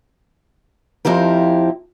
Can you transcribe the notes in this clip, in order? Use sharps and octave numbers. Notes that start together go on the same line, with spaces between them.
F2 F3 E4 G4 A#4